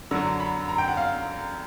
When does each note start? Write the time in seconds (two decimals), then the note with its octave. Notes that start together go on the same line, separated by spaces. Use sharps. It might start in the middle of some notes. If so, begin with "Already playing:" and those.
0.11 F#2 D3 F#3 E6
0.40 B5
0.68 A#5
0.78 G5
0.88 F#5
0.97 F5